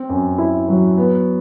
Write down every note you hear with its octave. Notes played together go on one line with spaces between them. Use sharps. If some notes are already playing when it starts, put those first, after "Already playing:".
Already playing: C4
F#2
E4
F#3
B3